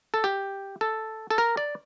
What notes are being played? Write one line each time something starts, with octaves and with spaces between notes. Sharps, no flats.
A4
G4
A4
A4
A#4
D5